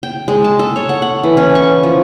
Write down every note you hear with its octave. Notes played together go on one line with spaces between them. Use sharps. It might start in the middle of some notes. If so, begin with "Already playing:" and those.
G5
G#3
A5
A4
C#5
F#5
F#5
E3
C#4
C#6
F3